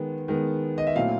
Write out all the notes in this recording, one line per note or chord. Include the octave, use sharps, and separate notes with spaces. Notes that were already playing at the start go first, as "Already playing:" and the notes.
Already playing: D#3 G#3 B3
D#3 G#3 B3
D#5
E5
A#2 F#3 A3 C4 E4 F5